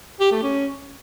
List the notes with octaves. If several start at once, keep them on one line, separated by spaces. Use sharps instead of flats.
G4
A3
C#4